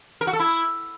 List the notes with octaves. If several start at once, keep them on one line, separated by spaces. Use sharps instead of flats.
A#4
F#4
A4
E4